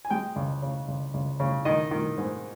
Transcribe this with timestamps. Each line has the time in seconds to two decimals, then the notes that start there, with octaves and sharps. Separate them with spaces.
0.05 G#5
0.10 G#3 G5
0.36 C#2
0.62 C#3
0.88 C#2
1.14 C#2
1.40 C#3
1.65 D#3 D#5
1.91 D#3
2.18 G#2